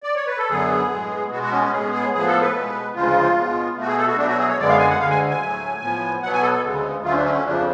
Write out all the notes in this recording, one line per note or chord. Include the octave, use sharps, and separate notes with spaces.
D5
C#5
B4
A4
F#2 D3 F#3 B3 G#4
A2 G#3 B3
B2 G#3 B3 F#4
F#4
C#4
C#4
A2 G#3 B3 G#4
G#4
A2 F3 B3 G#4
A4
B4
B2 G#3 B3
D2 C#3 F3 G#3 F4
B2 G#3 B3
B2 A3 F#4
G#4
A4
F#4
B2 F#3 A3 D4
F#4
G#4
C#5
F#2 D3 G#3 B3 D5
F5
G#5
F#5
D2 D3 G#3 F5
G#5
G#5
A2 F#3 A3
A2 F3 B3
B2 F#3 B3 F#5
G#5
A4
A4
D2 C#3 G#3 B3
D2 D3 F#3 A3 F4
C#4
D4
C#4
C#4
F2 C#3 F3 D4